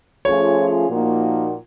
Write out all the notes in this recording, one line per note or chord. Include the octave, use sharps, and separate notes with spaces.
F3 A3 C#4 F4 G#4 C#5
A#2 F3 A#3 D#4 F#4